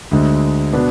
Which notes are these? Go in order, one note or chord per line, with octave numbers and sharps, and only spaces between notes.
D2 D3 G#3
B2 B3 D4